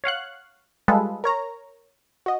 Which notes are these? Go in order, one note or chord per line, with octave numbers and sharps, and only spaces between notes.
C#5 F5 F#5 F#6
G3 G#3 F4 G#4 A4 B4
A#4 C#5 A#5
F#4 D#5